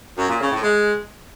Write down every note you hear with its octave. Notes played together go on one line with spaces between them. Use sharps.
F#2
A#2
C#3
A2
G#3